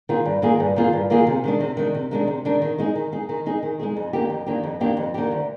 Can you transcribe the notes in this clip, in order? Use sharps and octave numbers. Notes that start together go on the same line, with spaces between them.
D#3 A#3 F4 G#4
G2
D#3 A#3 F4 G#4
G2
D#3 A#3 F4 G#4
G2
D#3 A#3 F4 G#4
C3
D#3 G#3 D4
C3
D#3 G#3 D4
C3
D#3 G#3 D4
C3
D#3 G#3 D4
D#3
G#3 D#4 G#4
D#3
G#3 D#4 G#4
D#3
G#3 D#4 G#4
D#3
G#3 D#4 G#4
F2
D#3 A#3 D4 G4
F2
D#3 A#3 D4 G4
F2
D#3 A#3 D4 G4
F2
D#3 A#3 D4 G4
D2